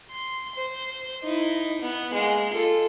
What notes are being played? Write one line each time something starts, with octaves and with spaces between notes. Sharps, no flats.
C6
C5
D#4 E4
B3
G#3 A#3
F4 A4